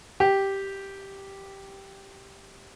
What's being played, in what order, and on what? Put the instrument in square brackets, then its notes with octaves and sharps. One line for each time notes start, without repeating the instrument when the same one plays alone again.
[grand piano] G4